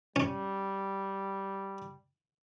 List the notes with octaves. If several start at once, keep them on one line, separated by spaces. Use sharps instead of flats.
G3 C#4